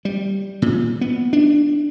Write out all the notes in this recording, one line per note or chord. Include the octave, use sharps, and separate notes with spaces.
G3
A#2
B3
D4